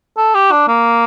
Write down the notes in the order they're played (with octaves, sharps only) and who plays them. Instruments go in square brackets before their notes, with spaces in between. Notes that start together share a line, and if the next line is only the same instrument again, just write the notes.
[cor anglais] A4
G4
D4
A#3